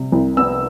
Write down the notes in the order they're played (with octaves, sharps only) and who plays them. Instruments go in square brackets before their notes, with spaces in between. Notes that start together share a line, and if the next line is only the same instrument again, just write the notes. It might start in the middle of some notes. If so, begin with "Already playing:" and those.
Already playing: [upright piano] C3 G3
C2
B3 E6